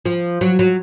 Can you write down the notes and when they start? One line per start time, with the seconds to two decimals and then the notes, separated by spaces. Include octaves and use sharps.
0.05 F3
0.41 F#3
0.59 F#3